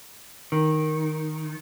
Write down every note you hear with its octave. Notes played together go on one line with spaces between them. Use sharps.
D#3